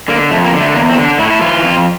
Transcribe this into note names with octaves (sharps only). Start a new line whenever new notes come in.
D3 A#3
F2 A3
A#3
D3
A3
E2 A#3
C4
D3
D4
A2 E4
E4
E3 F4
F2